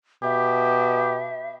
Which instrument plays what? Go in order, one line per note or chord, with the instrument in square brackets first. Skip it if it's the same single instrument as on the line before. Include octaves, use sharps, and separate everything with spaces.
[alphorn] B2 [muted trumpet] G4 [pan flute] E5